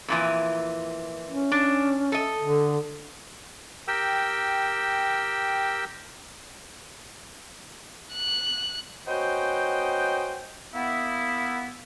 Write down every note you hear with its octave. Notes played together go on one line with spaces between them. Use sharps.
F2 A#2 E3
C#4
D4
A4 D#5
D3
G4 A#4 G5 E6
F#6
B3 C#4 F#4 C5 D#5 G5
A#3 B3 E4